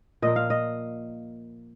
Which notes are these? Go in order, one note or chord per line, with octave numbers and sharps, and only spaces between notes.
A#2 F3 A#3 D#5
F5
D#5